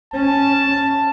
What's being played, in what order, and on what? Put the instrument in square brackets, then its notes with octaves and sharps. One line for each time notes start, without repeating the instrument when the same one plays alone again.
[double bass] C#4 [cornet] A5